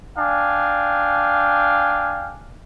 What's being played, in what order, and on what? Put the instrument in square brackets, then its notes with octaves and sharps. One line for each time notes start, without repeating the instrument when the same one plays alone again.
[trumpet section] D4 F5 G5 G#5